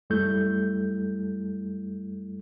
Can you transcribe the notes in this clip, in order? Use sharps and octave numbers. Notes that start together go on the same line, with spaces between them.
F#2 G3 A3 E4 A4 G6